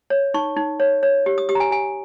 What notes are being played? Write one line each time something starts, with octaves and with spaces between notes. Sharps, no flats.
C#5
D#4 C#6
D#4
C#5
C#5
G4
D#6
G4 D#6
A#5
G#5
G4 G#5